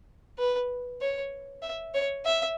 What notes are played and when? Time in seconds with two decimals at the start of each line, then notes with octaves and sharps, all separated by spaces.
0.38 B4
1.01 C#5
1.62 E5
1.94 C#5
2.25 E5